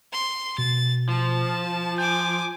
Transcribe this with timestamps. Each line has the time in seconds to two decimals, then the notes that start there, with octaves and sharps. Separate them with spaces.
0.13 C6
0.58 B2 A6
1.09 F3 A5
1.98 G#5 D6 G6